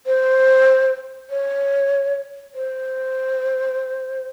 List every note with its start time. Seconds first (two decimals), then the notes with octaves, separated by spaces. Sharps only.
0.06 C5
1.30 C#5
2.55 C5